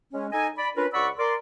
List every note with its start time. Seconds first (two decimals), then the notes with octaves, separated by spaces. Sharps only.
0.12 G#3 C#4
0.32 D#4 A4 D#5 G#5
0.57 D5 B5
0.76 C#4 D4 F4 A#4 B4
0.93 C#2 D5 F#5 B5 C#6 E6
1.18 A#4 D5 C6